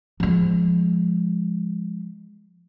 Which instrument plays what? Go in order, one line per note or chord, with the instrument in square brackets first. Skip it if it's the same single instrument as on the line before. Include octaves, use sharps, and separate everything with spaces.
[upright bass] F3 G#3